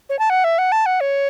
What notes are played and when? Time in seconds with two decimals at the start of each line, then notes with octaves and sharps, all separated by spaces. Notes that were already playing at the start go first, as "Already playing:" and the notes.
0.09 C#5
0.19 A5
0.30 F#5
0.44 E5
0.58 F#5
0.72 A5
0.86 F#5
1.01 C#5